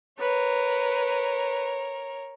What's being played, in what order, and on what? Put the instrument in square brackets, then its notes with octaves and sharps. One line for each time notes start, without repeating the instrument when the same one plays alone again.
[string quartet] A#4 C#5 [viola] B4